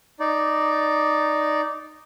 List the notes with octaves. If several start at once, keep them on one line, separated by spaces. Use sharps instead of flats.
D#4 D5